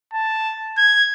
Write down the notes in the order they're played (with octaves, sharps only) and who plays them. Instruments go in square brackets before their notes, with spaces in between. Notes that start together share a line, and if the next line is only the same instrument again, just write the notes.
[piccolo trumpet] A5
G#6